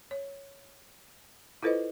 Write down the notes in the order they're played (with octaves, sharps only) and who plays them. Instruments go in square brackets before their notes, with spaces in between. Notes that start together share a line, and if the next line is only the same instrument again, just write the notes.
[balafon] C#5
E4 F4 A4 B4 C5 D#5